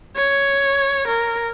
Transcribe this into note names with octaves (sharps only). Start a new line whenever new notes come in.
C#5
A#4